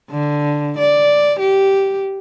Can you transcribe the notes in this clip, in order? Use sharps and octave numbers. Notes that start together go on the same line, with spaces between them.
D3
D5
G4